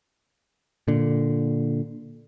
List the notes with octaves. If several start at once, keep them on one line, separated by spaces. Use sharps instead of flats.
A#2 D3